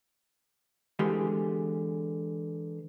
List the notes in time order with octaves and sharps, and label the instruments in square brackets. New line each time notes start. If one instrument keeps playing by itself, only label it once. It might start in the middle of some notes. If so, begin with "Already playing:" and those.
[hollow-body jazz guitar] D3 E3 G#3 G4 C6